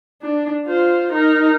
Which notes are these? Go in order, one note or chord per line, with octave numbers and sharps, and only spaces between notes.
D4
F4 C5
D#4 A#4